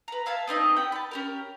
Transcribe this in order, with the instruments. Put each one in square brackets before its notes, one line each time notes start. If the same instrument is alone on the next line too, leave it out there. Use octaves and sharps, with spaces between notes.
[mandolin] B4 A#5
E5 F5 G#5 A5
B3 C4 D#4 D#5
G4 F#5 G5
A5 B5
C#4 G4 A#4